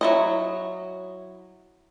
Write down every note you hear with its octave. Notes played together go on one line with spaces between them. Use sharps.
F#3 E4 D#5